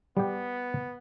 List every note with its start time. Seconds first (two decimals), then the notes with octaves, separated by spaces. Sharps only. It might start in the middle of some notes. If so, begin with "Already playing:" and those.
0.17 G3 B3 G4